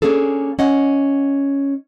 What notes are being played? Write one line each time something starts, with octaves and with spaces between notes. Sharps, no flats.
A#3 C#4 D4 G#4 A4
C#4 D#5 F#5